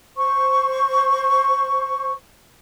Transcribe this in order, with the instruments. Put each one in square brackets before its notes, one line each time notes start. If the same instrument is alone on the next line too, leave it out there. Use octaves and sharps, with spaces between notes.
[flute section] C5 C#6